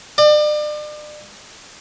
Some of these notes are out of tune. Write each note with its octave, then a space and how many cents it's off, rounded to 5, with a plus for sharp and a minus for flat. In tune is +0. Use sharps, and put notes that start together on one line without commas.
D5 +40